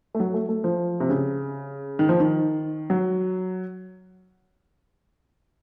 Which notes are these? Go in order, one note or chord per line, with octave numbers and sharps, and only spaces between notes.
A3
F#3
A3
A3
F3
C3
C#3
D#3
F3
D#3
F#3